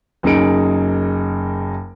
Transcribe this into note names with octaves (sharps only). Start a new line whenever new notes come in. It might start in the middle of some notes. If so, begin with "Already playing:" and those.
F#1 F#2 D#4 G#4 C#7 D7